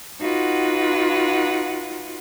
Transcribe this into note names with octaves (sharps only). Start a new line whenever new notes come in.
D#4 F4 F#4 B4 F#5